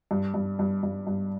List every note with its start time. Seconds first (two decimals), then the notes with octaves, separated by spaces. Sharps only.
0.11 G2
0.34 G2
0.59 G2
0.83 G2
1.07 G2